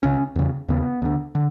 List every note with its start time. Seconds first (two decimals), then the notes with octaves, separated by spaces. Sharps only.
0.03 C#2 C#3 C#4
0.36 E2 C#3
0.69 D#2 C#3 B3
1.02 D2 D3
1.35 D3